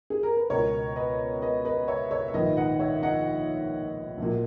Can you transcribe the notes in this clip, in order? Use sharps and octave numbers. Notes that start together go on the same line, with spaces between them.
G#4
A#4
B4
C#2 B2 A#4 C#5
B4 D#5
B4 D#5
B4 D#5
C#5 E5
C#5 E5
E5
A#1 G#2 D#3 B4 D#5
D#5 F#5
C#5 E5
D#5 F#5
A#1 A#2